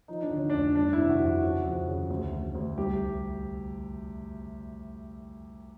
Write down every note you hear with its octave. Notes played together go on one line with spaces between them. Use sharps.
F3 D#4
D4
D3
C#4
F1 D4
G1 D4
E4
C3
F#4
F2
F#4
C#3
F2
C#3
D2
D2
D2
C2 G4